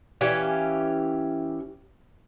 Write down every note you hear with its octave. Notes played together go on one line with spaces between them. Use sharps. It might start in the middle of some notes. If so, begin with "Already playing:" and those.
E3 C#4 G4 F5